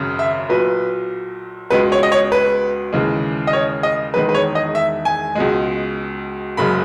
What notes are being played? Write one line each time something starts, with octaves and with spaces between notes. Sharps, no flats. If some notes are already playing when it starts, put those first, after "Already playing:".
Already playing: G#1 F#2 C#3
E5
B1 A#2 F#3 B4
C#2 B2 G#3 B4
C#5
D#5
C#5
B4
D#2 C#3 E3 G#3
D#5
C#5
D#5
E1 E2 D#3 G#3 B4
B4
C#5
D#5
E5
G#5
C#2 B2 G#3
F#1 F#2 C#3 G#3 B5